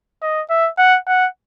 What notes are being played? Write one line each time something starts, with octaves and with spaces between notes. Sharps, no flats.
D#5
E5
F#5
F#5